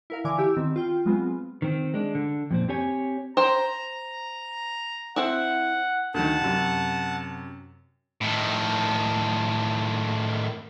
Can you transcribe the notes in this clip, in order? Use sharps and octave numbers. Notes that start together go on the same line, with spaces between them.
E4 A#4 F5
D3 E3 G#5 D6
E4 F#4 G4 E6
D#3 B3 C4
F4 G5
F#3 G#3 B3 C4 F4
D#3 C4
G#3 D4
D3
F2 A#2 C4
C4 G4 C#5 G#5
C5 G5 A#5
C4 E4 F#5
D2 D#3 F#5 A5
F#2 C3
A2 D#3